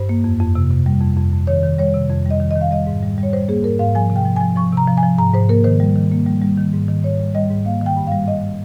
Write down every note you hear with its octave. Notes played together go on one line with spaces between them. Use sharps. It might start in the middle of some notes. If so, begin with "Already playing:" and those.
Already playing: G2 C5
A#3
F2
F2
C3
C3
G3
F2
F2
F2
D#3 C#5
D#3
G3 C#5
C3
F2
G3 D#5
D#3
D#5
D#3
F5
G3 D#5
G#2
G3
G3
C#5
G3 C5
A#3 G#4
G#2 A#4
G#2 F5
F3 G#5
C3
G5
F3
F3 G#5
F3 C#6
C3 A#5
F3
G#5
F3
G#2 A#5
G#2 C5
A#3 A#4
D#3 C5
G3
D#3
A#3
G3
G3
D#3
G#2
D#3
G#2 C#5
G3
G3 D#5
G#2
A#3 F5
D#3
G5
G2
G3 F5
G3 D#5